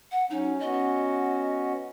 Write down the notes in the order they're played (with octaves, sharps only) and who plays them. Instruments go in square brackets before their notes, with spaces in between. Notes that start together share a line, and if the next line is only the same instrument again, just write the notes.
[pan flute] F#5
[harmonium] F#3 C#4 [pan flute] D#4
[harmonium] B3 C#4 F#4 [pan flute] D#5
[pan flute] D#5